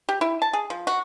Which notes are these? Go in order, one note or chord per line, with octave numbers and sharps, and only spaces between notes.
G4
E4
A5
G#4
F3
F#4